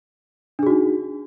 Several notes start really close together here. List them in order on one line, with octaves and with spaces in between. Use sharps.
D4 G#4 F#4 D#4